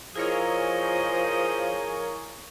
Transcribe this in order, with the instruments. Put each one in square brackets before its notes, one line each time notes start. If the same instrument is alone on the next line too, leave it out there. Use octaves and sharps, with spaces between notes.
[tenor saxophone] F3 [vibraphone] E4 F5 [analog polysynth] G#4 A#4 C#5 [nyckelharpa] D#5